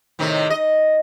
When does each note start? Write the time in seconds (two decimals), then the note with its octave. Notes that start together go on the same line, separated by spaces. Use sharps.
0.19 A2 C3 D#3
0.50 D#5